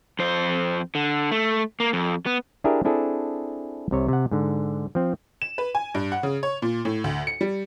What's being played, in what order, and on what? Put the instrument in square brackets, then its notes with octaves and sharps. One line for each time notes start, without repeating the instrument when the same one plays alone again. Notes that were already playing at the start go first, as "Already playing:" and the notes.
[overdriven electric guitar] F2 C5
D3
A3
A#3
F2
B3
[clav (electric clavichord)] D4 E4 G4 G#4 A#4 E5
C4 D4 E4 G#4 A4
C2 C3 C#5
C3 F#5
G#2 D3
F3 C4
[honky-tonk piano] E7
B4
G#5
G2
F#5
C#3
C#5
A#2
A2
D2
C#7
G3